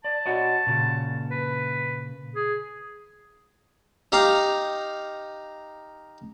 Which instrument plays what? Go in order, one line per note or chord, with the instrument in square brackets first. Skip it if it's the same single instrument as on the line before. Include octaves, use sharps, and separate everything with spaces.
[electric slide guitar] D5 [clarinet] A5
[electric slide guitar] F#4 C#5 D#5
A#2 C#3
[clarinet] B4
G#4
[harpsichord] D#4 G4 F5 A#5